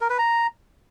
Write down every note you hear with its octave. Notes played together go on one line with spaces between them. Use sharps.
A#4
B4
A#5